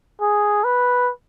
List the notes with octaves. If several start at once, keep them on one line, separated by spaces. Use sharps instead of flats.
G#4
B4